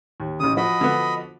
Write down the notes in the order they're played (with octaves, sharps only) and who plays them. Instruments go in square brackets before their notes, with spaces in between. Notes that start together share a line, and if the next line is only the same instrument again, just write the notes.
[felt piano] D#2
[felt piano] A1 C#3 [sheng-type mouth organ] D#6
[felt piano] F3 F#4 [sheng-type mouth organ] D#5 B5
[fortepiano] D3 B3